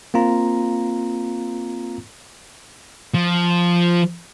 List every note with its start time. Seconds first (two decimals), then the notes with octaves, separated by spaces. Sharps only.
0.14 A#3 C4 F4 A#5
3.14 F3